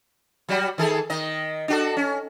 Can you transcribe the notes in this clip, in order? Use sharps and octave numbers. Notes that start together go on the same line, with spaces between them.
F#3 G3 F#4
D#3 G#4 A4
D#3 D#5
D4 F#4 A4
C#4